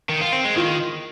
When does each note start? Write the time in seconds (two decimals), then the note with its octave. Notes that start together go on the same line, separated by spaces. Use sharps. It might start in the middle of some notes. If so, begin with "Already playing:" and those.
0.09 D#3
0.21 F4
0.32 C4
0.44 G#3
0.55 D#3 F4